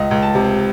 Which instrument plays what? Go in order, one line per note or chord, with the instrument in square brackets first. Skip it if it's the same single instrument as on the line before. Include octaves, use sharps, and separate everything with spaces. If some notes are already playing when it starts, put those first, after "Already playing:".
Already playing: [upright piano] C#2 D#5
C#2
A5
C3